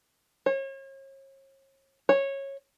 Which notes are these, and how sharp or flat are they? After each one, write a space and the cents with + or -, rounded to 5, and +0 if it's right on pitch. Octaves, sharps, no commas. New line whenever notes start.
C#5 -40
C#5 -15